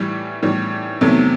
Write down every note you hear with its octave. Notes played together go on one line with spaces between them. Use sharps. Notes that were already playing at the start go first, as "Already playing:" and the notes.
Already playing: A2 E3 G3
A2 E3 G3
E2 C3 D#3 F#3 A3